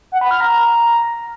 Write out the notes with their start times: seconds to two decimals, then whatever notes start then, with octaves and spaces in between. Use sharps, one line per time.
0.12 F#5
0.21 B5
0.31 F6
0.40 A#5